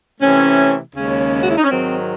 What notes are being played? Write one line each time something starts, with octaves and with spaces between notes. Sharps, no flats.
C3 E3 A3 C#4
D#2 C#3 G#3 C#4
F#4
E4
D#4
C#4
G#2 D#3 F#3 C4